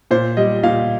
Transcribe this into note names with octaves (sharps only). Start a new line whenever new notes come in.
A#2 C5
G3 D#5
A#2 F5